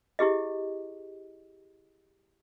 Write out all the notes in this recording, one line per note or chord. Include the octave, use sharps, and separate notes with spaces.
E4 G4 G#4 D#5